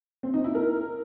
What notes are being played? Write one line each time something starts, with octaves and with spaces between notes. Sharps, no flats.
C4
D#4
E4
A#4